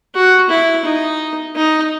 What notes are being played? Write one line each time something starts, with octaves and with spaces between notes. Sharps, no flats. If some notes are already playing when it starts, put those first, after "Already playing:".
F#4
E4
D#4
D#4